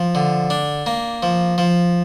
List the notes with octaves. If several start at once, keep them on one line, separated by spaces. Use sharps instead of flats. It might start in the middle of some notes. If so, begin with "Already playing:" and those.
Already playing: F3
D3
D4
A#3
F3
F3